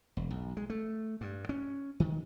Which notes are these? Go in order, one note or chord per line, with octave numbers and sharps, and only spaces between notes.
E1
B1
G#3
A3
G2
C#4
D#3